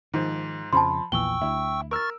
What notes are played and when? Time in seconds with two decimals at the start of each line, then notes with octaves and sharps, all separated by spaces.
0.14 G#2 D#3 F3
0.73 F2 C#3 F3 A5 B5 C6
1.12 A#1 E2 A#2 E3 G5 C#6 E6 G7
1.41 D2 E4
1.91 A#4 C#6 E6 F6 A6